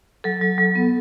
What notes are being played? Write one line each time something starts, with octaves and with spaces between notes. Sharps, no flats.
F#3 A4
F#3
F#3
B3